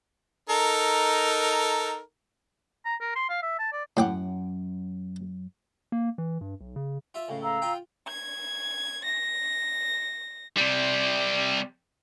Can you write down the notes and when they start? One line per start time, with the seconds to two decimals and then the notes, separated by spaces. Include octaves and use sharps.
0.50 D#4 A4 A#4
2.85 A#5
3.01 A#4
3.16 C6
3.29 F5
3.42 E5
3.59 A5
3.73 D5
3.97 F#2 A2 F#5 G5 D6
5.92 A#3
6.18 E3
6.41 G2
6.61 B1
6.76 C#3
7.14 F4 E5
7.28 C#2 A2 F5
7.42 F5 A#5 E6
7.62 F4 G5
8.06 G#6
9.05 A#6
10.58 C3 G3